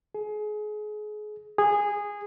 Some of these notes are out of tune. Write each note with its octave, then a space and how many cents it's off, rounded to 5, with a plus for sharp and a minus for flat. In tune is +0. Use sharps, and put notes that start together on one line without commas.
G#4 +30
G#4 -15